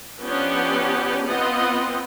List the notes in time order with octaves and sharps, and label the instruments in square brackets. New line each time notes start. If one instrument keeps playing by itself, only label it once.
[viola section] F3 B3 C#4 D4 G4
B3 C4 F4 D#5